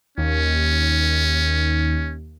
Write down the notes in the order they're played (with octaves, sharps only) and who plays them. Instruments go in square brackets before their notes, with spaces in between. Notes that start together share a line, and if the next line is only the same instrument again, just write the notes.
[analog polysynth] D#2 [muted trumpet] C#4